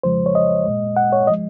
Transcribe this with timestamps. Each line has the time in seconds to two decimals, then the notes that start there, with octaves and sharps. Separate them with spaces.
0.03 F2 C#3 F3 G#3 C5
0.26 C#5
0.35 D#5
0.66 A#2 G#3
0.97 F#5
1.13 C#5
1.27 F3 G#3 D#5